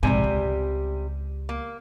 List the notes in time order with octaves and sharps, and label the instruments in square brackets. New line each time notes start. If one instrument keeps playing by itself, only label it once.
[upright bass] A#1 G#2 [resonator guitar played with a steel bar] C3 G3 G#5
[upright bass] C#2
[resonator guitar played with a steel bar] A#3